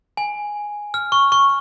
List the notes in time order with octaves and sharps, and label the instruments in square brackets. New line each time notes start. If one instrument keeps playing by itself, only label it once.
[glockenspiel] G#5
F6
C#6
C#6